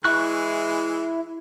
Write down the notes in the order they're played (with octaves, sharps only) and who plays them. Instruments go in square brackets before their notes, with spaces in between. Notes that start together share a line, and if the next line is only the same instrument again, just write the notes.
[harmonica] E3 G#3 [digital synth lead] E4 [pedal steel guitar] C#6 F#6